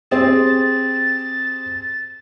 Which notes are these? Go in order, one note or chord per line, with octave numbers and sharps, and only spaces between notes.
C4 G4 G#4 A6